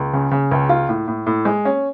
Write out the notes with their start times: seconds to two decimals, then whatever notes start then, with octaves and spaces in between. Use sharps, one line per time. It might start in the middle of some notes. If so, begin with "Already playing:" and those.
Already playing: C#2
0.13 C#3
0.31 C#3
0.51 C#2
0.69 F4
0.89 A2
1.08 A2
1.26 A2
1.45 G#3
1.65 C#4